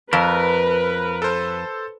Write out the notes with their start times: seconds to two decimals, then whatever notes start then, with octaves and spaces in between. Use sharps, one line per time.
0.13 F2 A#4 B4
1.22 A4 C5